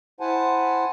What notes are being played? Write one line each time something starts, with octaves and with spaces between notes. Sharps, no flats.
E4 C5 F#5 G#5 A5